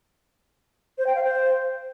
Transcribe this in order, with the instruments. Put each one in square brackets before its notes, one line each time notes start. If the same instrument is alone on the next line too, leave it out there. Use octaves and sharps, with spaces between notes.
[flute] C5
G5
F5
C5